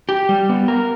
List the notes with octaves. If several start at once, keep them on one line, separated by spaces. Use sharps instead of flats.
G4
G3
B3
A#4